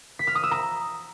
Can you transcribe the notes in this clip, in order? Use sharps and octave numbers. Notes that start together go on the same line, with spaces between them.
B6
F6
D#6
E6
A#5